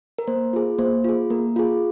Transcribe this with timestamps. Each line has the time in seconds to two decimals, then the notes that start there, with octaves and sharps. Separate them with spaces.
0.18 A#4
0.28 A#3 C5
0.53 F4 G#4
0.79 A#3 C5
1.04 F4 G#4
1.30 A#3 A#4
1.56 F4 G#4